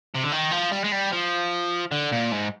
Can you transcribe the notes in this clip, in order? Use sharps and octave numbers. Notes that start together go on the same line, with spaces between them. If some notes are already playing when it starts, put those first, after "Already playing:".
C3
D3
D#3
F3
G3
G#3
G3
F3
D3
A#2
G#2